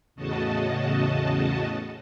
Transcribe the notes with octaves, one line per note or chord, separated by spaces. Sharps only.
E2 A2 C#3 F#4 D#5 A5